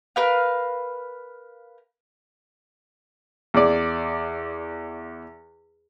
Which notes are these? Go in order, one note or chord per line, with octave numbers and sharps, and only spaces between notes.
A#4 B4 F5
E2 D5